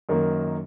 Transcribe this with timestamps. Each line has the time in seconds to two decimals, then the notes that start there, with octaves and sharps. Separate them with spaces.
0.09 F#2 D#3 A#3